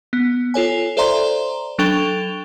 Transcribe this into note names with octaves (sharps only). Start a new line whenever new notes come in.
B3
F4 A4 C#5 G#5
A4 C5 D5 E5 A#5 C6
F#3 D4 A4 G5 F7 G7